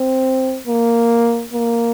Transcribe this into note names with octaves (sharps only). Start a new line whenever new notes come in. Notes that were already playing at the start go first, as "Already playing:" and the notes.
Already playing: C4
A#3
A#3